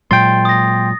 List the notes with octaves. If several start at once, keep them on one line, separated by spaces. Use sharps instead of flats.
A#2 F#3 G#3 G5 C6 A6
D#6 A#6